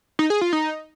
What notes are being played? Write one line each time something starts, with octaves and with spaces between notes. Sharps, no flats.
D#4
G#4
F4
D#4